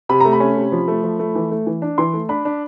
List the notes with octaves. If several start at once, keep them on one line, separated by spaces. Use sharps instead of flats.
C3 B5
A3 A#5
B5
C#4
C3
F3
A3
F3
A3
E3
A3
E3
D4
E3 C6
A3
D4 B5
D4